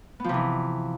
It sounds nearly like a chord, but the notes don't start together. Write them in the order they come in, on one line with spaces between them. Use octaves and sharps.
B3 F3 C3 E3